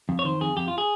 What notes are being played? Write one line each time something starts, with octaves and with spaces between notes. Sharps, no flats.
F2
C#5
D#3 C5
F2 G#4
F2 G4
F4
G#4